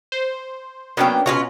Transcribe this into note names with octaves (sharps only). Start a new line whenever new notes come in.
C5
F#3 A#3 B3 C#4 D4 G5
B2 C#4 F4 F#4 C#5 A#5